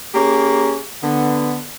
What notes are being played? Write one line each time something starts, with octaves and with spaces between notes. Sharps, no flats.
A#3 C#4 G4 G#4
D3 B3